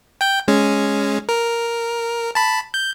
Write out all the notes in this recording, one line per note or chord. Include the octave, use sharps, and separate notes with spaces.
G5 G6
G#3 C#4
A#4
A5 B5
G6